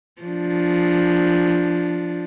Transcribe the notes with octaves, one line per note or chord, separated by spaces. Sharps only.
F3 D4